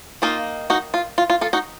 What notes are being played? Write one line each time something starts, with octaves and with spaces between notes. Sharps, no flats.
D#3 A#3 D#4 F4
D#4 F#4
F4
F4
F4
F4 A4
D#4 F#4